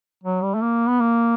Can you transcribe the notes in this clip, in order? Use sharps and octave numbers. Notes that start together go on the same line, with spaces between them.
F#3
G3
A3
A#3
B3
A#3